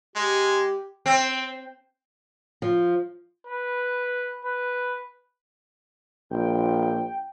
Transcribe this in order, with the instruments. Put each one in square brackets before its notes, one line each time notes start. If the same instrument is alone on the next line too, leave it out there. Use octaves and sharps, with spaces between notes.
[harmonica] G#3 [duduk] G4
[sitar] C4
[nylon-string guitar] F3
[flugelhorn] B4
B4
[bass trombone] A#1 [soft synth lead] G5